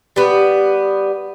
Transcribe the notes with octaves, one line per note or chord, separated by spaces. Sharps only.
G3 B3